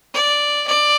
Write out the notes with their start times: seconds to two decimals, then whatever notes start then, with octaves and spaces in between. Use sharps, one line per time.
0.14 D5
0.67 D5